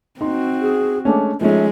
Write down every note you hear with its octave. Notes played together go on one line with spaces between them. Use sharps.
C4 D#4 F#4 C6
G#4
G#3 A3 C#4 D4
F3 G#3 A3 C#4 D#4 E5